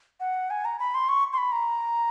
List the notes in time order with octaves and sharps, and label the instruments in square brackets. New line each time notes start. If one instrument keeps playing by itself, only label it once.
[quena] F#5
G#5
A#5
B5
C6
C#6
C6
B5
A#5